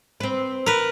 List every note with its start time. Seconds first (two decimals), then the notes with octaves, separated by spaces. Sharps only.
0.20 C4 B4
0.66 A#4 B4